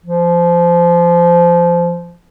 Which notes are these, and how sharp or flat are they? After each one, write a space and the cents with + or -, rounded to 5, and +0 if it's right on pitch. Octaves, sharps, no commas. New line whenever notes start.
F3 -20